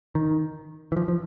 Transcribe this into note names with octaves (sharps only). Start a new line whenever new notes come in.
D#3
E3
F3
F3